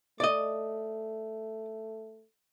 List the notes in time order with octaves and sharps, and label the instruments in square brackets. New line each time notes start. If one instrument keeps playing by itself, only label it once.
[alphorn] A3 [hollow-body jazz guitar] D5 D#5